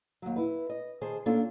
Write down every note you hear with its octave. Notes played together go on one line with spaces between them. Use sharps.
D#2 F#3
E4 B4
D#5
D#3 G#4 C5 A5
A#3 C#4 D4 F4 A4